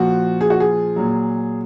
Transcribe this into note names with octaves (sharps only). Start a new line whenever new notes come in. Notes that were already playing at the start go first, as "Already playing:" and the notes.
Already playing: A#2 F3 F#4
G#4
F#4
G#4
A#2 F#3